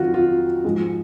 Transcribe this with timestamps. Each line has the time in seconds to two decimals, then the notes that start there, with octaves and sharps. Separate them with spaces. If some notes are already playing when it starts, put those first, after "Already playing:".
Already playing: F2 D#3 F#3 F4 F#4
0.14 F4
0.64 G#2 F3 G#3